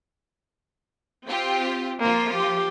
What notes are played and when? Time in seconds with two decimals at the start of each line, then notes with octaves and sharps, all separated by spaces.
1.26 C4 F4 G4
2.00 F3 A#3 F4 C5
2.34 G4